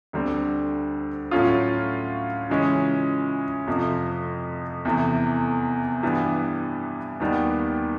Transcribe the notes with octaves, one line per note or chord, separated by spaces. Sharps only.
D2 D3 G3 C4
A2 F#3 A3 C#4 F4
C#3 E3 G#3 C#4
F2 C3 F3 A3
E2 C3 E3 A3
G2 E3 G3 B3
D#2 D#3 G3 B3